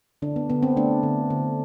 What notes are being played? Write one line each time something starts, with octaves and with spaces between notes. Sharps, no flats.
D3 D4
B3
D3 B3
C4
A3 D4
D3
D3